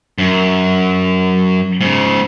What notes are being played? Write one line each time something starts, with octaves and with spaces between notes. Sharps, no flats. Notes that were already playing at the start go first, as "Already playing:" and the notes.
F#2
G#2 C#3